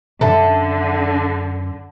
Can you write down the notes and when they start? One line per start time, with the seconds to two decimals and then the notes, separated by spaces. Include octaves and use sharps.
0.21 F#2 D3 A4 E5